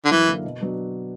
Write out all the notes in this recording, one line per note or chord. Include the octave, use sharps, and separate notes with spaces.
D3
F#2 E3
D3 A#3 E4 A#4
B2
F#3 B3 D4